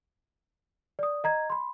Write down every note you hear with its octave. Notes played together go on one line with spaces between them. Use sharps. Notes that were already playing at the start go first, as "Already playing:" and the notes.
D5 D#6
D#5 A#5 G#6
B5 C6